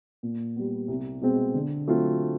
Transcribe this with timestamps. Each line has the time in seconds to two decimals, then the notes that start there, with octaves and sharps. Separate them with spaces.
0.23 A#2
0.56 G3 B3
0.88 C2
1.21 B2 G#3 C4
1.54 D3
1.87 F#3 A3 C4 F4